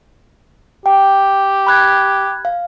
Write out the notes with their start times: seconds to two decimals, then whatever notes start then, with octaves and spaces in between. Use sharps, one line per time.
0.86 G4 G5
1.67 B5 F#6 G#6
2.45 F5